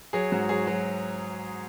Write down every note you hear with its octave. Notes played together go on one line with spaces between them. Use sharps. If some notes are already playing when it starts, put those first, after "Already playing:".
F#3 G#4
G#2 F#4
F#3 G#4
F#3